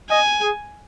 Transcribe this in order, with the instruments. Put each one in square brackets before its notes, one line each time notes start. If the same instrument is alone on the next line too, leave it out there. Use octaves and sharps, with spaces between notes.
[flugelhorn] D#5 [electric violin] G#5
[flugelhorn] G#4